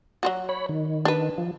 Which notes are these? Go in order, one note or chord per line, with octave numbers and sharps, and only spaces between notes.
F#3 F4 F#4
C#5 B5
D#3
D4 B4
F3